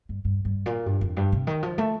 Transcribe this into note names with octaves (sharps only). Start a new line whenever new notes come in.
G2
G2
G2
A#2
G2
F2
G2
C3
D#3
F3
A3